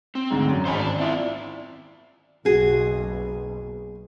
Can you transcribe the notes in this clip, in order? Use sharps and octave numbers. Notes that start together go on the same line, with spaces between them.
C4
D2 G#2
F#2
G#1 C5 D#5 G#5 B5
D4
C4 E4 F4 D5
F#1 B1 B2 F#4 G#4